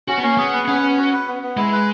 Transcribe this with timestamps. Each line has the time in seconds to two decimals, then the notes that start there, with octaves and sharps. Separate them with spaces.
0.08 C#4 F#4
0.17 B3
0.23 A#3 C#4
0.38 B3 G#4
0.53 B4
0.68 B3 C#4
0.83 B3
0.98 F#4
1.13 B4
1.28 B3
1.43 B3
1.57 G#3 E4
1.73 B4